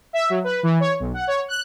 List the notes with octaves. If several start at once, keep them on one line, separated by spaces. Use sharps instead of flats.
E5
F#3
B4
E3
C#5
B1
F#5
C#5
F#6